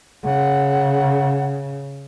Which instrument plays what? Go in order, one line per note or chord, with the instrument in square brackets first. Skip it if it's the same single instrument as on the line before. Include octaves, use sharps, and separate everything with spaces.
[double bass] C#3 [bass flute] F#5